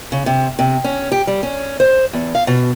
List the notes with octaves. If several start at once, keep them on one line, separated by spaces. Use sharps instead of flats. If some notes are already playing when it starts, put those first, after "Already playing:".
C#3
C3
C3
C#4
G4
G3
C#4
C5
E2
F5
B2